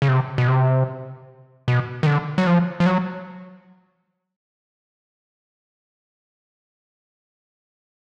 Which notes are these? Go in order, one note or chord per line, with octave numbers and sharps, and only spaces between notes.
C#3
C3
B2
C3
B2
D#3
D3
F#3
F3
F3
F#3